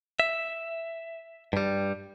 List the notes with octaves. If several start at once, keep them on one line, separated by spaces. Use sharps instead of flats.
E5
G2 G3